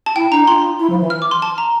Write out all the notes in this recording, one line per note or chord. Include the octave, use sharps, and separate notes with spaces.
A5
E4 G5
D4 A#5
F4 C6
E4
F3
E3
F6
D6
C6
A5
A#5